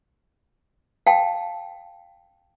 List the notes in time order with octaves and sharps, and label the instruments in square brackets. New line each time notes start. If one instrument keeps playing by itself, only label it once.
[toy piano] F5 G5 A5